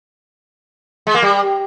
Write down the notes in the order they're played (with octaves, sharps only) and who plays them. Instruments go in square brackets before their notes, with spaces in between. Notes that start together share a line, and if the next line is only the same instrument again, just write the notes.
[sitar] G#3
A#3
G3